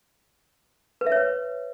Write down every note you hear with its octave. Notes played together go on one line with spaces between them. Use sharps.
B4
E5
C#5
B4